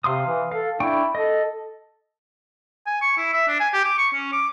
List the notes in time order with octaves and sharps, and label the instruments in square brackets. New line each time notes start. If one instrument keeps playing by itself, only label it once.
[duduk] C3 [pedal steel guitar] F5 C6 D#6
[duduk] E3
[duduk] A4 [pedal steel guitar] F5
[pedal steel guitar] D4 G5 C#6 [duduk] E4
[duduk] A4 [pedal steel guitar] D#5
[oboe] G#5
C#6
E4
E5
D4
G#5
G4
D6
C#6
C#4
D6